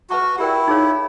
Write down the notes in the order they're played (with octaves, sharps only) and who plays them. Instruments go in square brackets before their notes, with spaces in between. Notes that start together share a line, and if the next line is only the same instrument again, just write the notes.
[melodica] F#4 [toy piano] B4 E5 A5 C#6
[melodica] E4 [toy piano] G4 A#4 D5 G5
[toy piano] D#4 G#4 C#5 F5